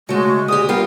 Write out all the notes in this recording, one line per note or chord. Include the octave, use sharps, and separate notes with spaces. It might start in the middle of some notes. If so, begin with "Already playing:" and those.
C#3 G#3 A3 F#4
D2 G4 G#4 D#6
G3 B3 F4 A#4 F5